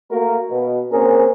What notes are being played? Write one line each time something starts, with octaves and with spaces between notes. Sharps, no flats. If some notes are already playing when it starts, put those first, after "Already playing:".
A3 A#3 F#4 A#4
B2
A#3 C4 C#4 G#4 A#4